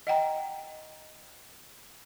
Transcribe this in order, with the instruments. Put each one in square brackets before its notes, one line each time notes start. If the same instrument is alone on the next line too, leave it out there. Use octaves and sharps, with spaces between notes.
[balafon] D#5 F#5 G5 A#5